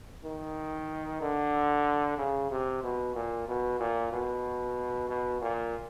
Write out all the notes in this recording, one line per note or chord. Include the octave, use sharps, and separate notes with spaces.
D#3
D3
C#3
C3
B2
A#2
B2
A#2
B2
B2
A#2